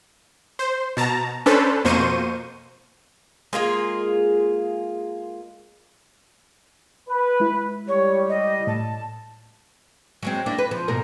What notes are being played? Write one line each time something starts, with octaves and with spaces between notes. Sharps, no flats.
C5
B2 A5 A#5
C#4 D4 A4 B4 C5
F2 B2 A#3 C5 C#6 D#7
G#3 A#3 F4 G#4
B4
G#3 E4
G3 C#5
D#5
A2 A5
F#3 G#3 C4
A#3 D4 E4
B4
F3
G#2 B2 A#4